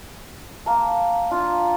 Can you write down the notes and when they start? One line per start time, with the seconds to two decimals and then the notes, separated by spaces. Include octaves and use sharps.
0.66 A#3 A5
1.31 D4 F4